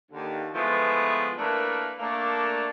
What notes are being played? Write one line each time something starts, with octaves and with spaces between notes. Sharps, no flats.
D#2 D3
E3 F3 G#3 A3 B3
E3 A3 A#3 D4 A#4 B4
A3 A#3 D4